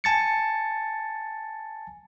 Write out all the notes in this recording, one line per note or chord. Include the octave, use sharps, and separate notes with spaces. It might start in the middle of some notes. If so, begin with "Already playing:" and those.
G#5 A5 A6 C#7